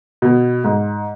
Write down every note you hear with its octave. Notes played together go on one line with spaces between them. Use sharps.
B2
G#2